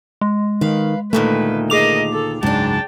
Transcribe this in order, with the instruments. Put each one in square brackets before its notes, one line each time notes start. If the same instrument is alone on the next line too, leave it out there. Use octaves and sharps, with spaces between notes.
[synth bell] G#3
[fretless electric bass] D#3 [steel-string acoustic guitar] B4 F5
[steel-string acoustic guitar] D2 A#2 D#3 [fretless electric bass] A3 [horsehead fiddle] B4
[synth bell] G#4 D6 F7 [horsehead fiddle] A#4 D#5
[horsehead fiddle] A4
[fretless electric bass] F#1 C#2 G#2 [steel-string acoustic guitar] F#3 D4 [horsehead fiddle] G5 A5